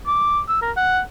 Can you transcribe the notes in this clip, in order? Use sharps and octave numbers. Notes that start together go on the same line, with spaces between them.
D6
E6
A#4
F#5